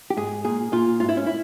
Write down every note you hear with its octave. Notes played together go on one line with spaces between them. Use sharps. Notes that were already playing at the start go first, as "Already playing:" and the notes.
G4
G#2 G#4
A#2 G#4
A#2 F4
G#2 F4
E4
C#4
E4